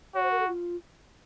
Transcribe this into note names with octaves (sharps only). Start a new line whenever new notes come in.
F#4 C#5
C5
A#4
A4
F4